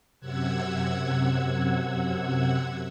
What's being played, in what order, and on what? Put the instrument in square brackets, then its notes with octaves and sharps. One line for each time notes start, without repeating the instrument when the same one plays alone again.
[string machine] F#2 C3 F#5 E6 G#6